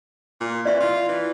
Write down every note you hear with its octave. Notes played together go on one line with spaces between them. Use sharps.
A#2
E3 D5 E5 C6
F4 C6
E3